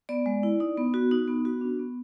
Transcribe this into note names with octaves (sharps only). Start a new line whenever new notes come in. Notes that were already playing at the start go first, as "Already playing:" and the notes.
B3 D5
G#3
E4
D#4
B3
F#4
D#4
B3
F#4
D4
B3